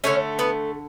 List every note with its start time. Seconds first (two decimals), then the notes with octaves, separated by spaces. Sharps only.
0.04 D3 A3 C#4 C#5
0.39 B3 B4